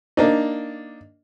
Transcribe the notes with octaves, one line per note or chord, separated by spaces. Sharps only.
A#3 D4 D#4